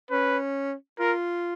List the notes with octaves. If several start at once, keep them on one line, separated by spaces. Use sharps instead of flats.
C#4 B4
F4 A#4